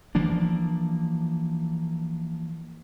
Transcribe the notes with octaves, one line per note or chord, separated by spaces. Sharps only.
E3 F3 A#3 D4